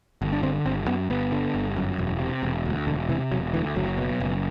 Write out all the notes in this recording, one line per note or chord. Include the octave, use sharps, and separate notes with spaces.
G1
D4
D3 C4
G1 C4
F#2 B3
G1 B3
D3
G1
F#2
E1
C3
E1
D2
E1 D3
C3 E3
E1 F#3
D2 E3
F#1 F#3
B2
F#1